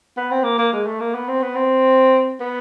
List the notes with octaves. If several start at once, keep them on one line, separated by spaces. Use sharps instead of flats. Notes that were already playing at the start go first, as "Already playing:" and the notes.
B3
C4
A#3
A#3
G#3
A3
A#3
B3
C4
B3
C4
B3